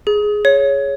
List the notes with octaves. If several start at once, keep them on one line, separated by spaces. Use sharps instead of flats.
G#4
C#5